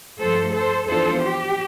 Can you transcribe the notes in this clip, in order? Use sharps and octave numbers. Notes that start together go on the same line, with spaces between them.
G2 F3 A3 A4 C5
A4 C5
F2 E3 B3 D4 F4 A4 C5
G4